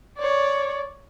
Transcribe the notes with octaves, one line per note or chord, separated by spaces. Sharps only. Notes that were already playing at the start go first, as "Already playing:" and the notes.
C#5 D5